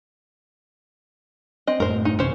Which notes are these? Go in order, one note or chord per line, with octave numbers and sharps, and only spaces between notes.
C4 D#5
F#2 A2 A3 A#4 C5
D#4
A1 C3 A3 C#4 C5